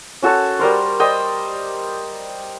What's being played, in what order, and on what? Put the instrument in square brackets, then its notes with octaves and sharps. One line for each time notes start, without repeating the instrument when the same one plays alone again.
[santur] C#4 F#4 A4 C#5
G3 A#4 C5
C5 D5 D#5 G5